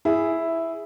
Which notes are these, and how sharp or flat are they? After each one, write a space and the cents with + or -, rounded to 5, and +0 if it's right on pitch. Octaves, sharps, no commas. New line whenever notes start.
E4 +0 G#4 +0